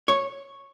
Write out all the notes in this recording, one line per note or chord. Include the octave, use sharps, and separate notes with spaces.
C#5